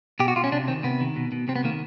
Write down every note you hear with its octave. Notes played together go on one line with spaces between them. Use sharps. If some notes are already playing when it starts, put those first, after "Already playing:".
B2 G4
F#4
B2 F4
C#4
C3 D4
D#3 C4
C3 B3
D#3
B2
B2
C3 C4
B3
D#3 A#3